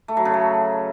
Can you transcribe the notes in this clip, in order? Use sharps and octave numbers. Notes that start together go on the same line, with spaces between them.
A3
F#3
C#3
A3